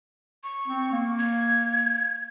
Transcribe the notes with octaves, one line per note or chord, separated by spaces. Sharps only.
C#6
C4
A#3
G#6